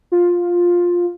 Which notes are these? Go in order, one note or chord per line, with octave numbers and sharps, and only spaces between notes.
F4